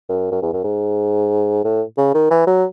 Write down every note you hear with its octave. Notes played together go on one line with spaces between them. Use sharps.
F#2
F#2
E2
F#2
G#2
A2
C#3
D#3
E3
F#3